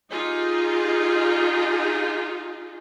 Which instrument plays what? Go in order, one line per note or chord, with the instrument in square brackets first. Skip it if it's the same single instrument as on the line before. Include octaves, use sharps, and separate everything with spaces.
[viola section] D#4 F4 G4 G#4